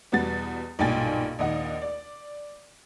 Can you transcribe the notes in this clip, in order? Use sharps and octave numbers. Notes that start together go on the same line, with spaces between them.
E2 B2 G3 B3 F#4 A6
B1 G2 A#2 G5 G#5 A6
A#1 D#2 D#5 F#5
D5